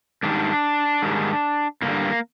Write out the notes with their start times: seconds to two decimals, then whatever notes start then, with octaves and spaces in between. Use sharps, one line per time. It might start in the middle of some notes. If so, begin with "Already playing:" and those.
0.23 G#2 D#3 G3 D4
1.02 G#2 D#3 G3
1.82 G2 D3 G3 A#3